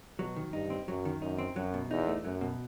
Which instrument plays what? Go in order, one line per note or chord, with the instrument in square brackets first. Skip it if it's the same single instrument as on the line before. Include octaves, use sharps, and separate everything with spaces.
[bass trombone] B2 [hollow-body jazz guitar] F#3
[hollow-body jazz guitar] D#3
[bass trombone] G2 [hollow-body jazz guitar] D#4
[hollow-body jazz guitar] C4
[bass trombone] F#2 [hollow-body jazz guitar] F#3
[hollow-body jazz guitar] D#3
[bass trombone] F#2 [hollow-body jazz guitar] D#4
[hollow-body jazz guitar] C4
[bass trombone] F#2 [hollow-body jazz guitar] F#3
[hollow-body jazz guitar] B2
[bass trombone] E2 [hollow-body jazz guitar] D#4
[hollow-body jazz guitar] A3
[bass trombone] F#2 [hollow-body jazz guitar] F#3
[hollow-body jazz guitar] B2